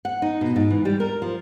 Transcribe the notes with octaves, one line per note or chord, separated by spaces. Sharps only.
F#5
D#4
B2
G#2
E3
G3
A#4
F3